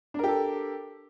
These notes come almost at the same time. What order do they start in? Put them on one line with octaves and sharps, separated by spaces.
D4 A#4 G4 A4